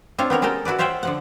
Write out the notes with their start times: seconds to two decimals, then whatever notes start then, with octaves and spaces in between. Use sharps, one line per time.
0.18 C4 D4 F4 C#5
0.30 B3 G4 A#4 C#5
0.42 G#3 C#4 A4 A#4 G5
0.65 E4 F#4 B4 D5
0.78 F4 C5 C#5 E5 F#5 G5
1.03 D3 F3 F#5